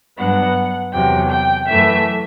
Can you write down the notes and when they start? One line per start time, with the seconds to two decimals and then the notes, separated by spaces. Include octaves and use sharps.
0.19 G2 F#3 B3 D4 F#5
0.94 E2 C3 F#3 G5
1.31 G5
1.69 F#2 E3 A3 E5